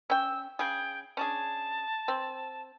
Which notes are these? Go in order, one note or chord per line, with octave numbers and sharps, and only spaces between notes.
C#4 G5 E6
C#3 G#4 G5
C#4 D4 G#4 A5
C4